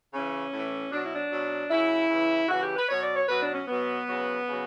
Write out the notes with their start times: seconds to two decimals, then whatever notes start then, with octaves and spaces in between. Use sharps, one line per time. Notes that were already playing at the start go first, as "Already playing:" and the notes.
0.12 C#3 E3 C#4
0.52 A2 E3
0.91 B2 F#3 D4
1.03 E4
1.14 D4
1.31 B2 F#3
1.70 C#3 F#3 E4
2.09 C#3 E3
2.49 C#3 E3 F#4
2.62 G4
2.76 B4
2.89 B2 F#3 C#5
3.02 D5
3.16 C#5
3.28 B2 F#3 B4
3.41 D4
3.54 C#4
3.68 B2 F#3 B3
4.08 C#3 F#3
4.47 C#3 F#3